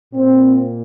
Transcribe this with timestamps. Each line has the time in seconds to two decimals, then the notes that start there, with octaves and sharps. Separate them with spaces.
0.14 A#2 C4